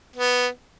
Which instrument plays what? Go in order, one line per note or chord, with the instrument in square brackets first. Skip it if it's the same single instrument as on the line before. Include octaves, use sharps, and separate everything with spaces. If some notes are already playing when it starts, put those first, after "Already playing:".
[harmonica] B3